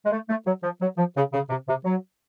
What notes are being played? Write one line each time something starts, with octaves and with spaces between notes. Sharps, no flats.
G#3
A3
A3
F#3
F3
F#3
F3
C#3
C#3
C3
C3
F#3